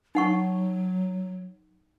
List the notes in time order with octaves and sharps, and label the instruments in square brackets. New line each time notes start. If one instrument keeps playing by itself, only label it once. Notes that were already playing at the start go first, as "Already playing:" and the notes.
[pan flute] F#3 [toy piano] D#4 F#5 C#6